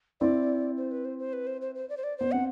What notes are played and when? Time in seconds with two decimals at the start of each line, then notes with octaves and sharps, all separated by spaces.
0.20 C4 E4 D5
0.77 C5
0.91 B4
1.05 C5
1.19 C5
1.33 B4
1.47 C5
1.61 C5
1.75 C5
1.89 D5
1.97 C5
2.04 D5
2.18 B3 C5
2.32 C4 F#5